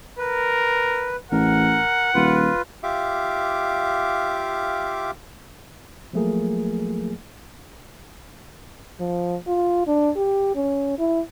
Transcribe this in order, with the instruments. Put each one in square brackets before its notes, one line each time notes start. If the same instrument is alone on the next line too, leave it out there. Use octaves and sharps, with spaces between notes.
[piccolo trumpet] A#4 [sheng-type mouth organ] B4
[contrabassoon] A1 [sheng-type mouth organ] A#4 [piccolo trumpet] F#5
[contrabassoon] D#1 [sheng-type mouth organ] F4 B4
[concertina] F4 G4 E5 F5 D6
[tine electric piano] F3 F#3 A3 A#3 G#4 A#4
[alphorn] F3
F4
D4
G4
C#4
E4